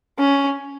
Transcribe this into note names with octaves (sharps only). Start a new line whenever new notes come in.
C#4